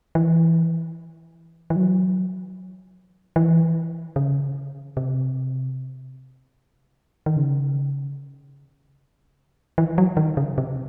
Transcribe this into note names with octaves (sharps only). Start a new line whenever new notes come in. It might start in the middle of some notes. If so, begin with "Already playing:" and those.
E3
E3
F#3
E3
C#3
C3
D#3
C#3
E3
F#3
D#3
C#3
C3